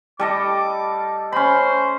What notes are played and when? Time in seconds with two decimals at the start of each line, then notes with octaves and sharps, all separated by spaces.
0.20 G3 A4 D#5 D6
1.32 C#4 C5 B5